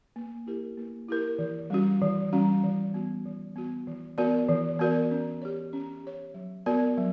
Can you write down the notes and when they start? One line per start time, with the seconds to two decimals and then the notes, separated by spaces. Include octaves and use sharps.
0.16 A#3
0.47 E4 G4 A#4
0.77 A#3
1.09 E4 G4 A#4
1.39 E3
1.70 G3 C#4 F#4
2.02 E3
2.33 G3 C#4 F#4
2.63 E3
2.94 B3 F#4
3.26 E3
3.56 B3 F#4
3.87 E3
4.18 B3 F#4 A#4 D5
4.49 E3
4.79 B3 F#4 A#4 D5
5.11 C#4
5.42 G4 C#5
5.73 C#4
6.03 G4 C#5
6.34 F#3
6.66 B3 F#4 A#4 D5
6.97 F#3